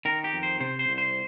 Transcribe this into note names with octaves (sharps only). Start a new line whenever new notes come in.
D#3 A#4
G4
F2
C5
C3 C5
C5
C2
C5